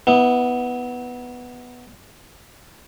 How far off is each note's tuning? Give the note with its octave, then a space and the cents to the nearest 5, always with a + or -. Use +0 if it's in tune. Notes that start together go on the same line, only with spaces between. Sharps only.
B3 +0 E4 -30